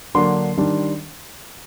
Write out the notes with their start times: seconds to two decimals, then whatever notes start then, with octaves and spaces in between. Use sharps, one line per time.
0.15 D3 F#3 A#3 D4 C6
0.58 D#3 G3 D4